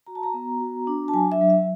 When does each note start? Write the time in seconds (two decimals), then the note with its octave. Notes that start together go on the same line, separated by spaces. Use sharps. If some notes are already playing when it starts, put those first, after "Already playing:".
0.07 F#4 A#5
0.15 A5
0.23 A#5
0.34 B3
0.60 F#4
0.87 D4
1.08 A5
1.13 F#3 G#5
1.32 E5
1.41 F#3
1.50 E5